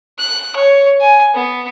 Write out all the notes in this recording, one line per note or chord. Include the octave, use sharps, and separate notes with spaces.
F#6
C#5
G#5
B3